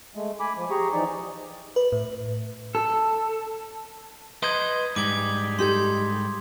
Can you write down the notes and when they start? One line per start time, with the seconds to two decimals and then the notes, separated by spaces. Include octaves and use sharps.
0.15 G#3 A3
0.40 G#5 B5 D6
0.57 F3
0.71 G4 G#4 A#5 C#6
0.93 E3 F3 D#4 D5
1.76 B4
1.92 A2
2.75 A4
4.43 B4 D#5 C6 D#6 G6 G#6
4.96 G#2 G3 D6 G#6
5.59 D#4 G4 A4 C6 G#6